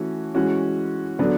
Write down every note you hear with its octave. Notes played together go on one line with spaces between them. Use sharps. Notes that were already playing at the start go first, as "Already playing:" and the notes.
Already playing: E3 A3 C#4 F#4
E3 G#3 C#4 F#4
D3 F#3 B3 D4